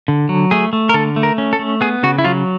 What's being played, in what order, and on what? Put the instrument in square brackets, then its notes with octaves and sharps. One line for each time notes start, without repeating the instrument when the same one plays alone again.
[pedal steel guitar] D3
F#3
A3 G#4
A3
A#4
D3 A4
A3
A#4
C#4
A4
A3
B3 G#4
C#3 F#4
E4
F#3 F4